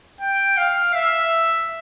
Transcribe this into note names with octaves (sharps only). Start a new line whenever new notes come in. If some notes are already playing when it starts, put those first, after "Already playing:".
G5
F5
E5